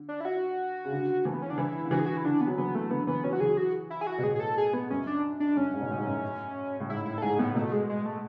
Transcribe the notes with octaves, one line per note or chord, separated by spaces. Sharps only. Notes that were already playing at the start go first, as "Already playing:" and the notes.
Already playing: D3
D4
E4
F#4
C#3
D3
E3 A3
B3
C#4
D3 D4
E3 E4
D3
E3 F#4
G#4
F#4
E4
D3 D4
B3
F#3
E3 B3
A3
D3 B3
E3 B3
F#3 C#4
F#4
E3 G#4
F#4
E4
G#4
F#4
B2
A2 G#4
G#4
A4
G#4
B3
F#2 C#4
D4
D4
F#2 C#4
G#2
B2
A2
G#2
F#2
A2
G#2 E4
A2 E4
A4
G#2 G#4
A2 B3
B2 A3
G#3
G#3
A3